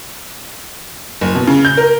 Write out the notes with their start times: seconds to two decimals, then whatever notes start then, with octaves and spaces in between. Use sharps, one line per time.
1.21 F#1
1.35 B2
1.47 C#3
1.65 G6
1.77 A#4